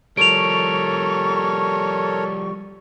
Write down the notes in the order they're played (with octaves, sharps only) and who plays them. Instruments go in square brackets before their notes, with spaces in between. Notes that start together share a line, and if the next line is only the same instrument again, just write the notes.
[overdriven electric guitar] F3 G3 [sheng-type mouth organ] A4 A#4 C#5 [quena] C#6 [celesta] D7 F7